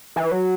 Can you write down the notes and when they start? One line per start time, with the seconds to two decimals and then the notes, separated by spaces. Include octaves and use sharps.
0.16 E3
0.32 F#3